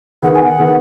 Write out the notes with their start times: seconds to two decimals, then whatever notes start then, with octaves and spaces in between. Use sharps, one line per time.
0.22 D#3 B3 G#4 F#5
0.34 G#5
0.46 F#5
0.58 D#3 B3 G#4